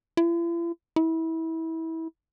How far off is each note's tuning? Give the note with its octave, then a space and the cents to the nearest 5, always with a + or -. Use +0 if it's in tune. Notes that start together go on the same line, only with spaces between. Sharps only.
E4 +45
E4 -25